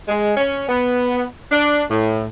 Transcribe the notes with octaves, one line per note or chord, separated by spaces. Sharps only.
G#3
C#4
B3
D4
A2